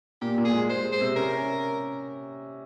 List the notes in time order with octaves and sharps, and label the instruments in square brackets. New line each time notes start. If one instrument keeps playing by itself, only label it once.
[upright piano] A#2 [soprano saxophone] G4
[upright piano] A#2
[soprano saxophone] G#4
[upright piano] G#3
[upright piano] G#3 [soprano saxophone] C5
[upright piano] G#3
[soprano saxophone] C5
[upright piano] C3
[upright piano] C#4 [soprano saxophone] A#4
[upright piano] C#4